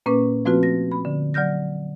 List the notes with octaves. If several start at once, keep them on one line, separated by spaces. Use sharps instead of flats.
A#2 A#3 C#4 B4 C#6 D6
F3 A3 C4 F4 F#4 B4
A#6
B5
D3
F#3 D5 F6 G6 A#6